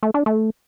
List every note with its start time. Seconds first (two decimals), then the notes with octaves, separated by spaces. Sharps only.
0.03 A3
0.14 D4
0.26 A3